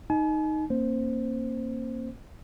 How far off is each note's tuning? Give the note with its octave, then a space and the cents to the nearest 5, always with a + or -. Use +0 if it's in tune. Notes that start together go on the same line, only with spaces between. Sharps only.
D#4 +0 G#5 +45
A#3 +0 C#4 -45 C5 +0